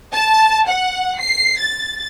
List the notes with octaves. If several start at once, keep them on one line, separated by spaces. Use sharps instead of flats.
A5
F#5
C7
A6